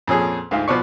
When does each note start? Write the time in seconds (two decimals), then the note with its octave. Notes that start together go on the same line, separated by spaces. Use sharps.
0.07 F2 A#2 C#4 G#4
0.51 D2 G#2 F4
0.68 B2 F3 B3 D5 C#6